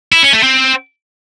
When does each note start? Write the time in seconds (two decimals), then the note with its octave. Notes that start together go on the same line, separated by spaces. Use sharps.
0.12 E4
0.23 C#4
0.33 A3
0.43 C4